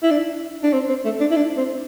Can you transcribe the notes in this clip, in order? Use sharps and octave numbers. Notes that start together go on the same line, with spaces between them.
E4
D4
D4
C4
C4
A3
D4
E4
D4
C4